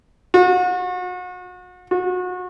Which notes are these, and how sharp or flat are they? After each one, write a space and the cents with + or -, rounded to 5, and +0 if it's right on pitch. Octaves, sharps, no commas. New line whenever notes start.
F#4 -35
F#4 -30